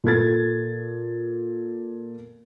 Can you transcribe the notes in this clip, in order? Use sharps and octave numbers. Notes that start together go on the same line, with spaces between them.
A#2 A4 G#6 A6